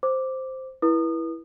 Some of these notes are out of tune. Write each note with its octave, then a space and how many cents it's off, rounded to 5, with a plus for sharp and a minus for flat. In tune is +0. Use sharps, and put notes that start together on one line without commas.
C5 +0 D6 +0
E4 +0 B4 -35 D#6 -30